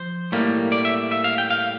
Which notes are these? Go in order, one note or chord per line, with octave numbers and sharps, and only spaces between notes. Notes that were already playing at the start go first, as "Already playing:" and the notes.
Already playing: F3 C5
A2 G3 A#3
D5
E5
E5
F5
G5
F5